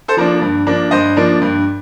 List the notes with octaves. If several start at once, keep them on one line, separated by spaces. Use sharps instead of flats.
A4 C5
F3 A#3 D4
G2
F3 A#3 D4
G2 C5 D#5
F3 A#3 D4
G2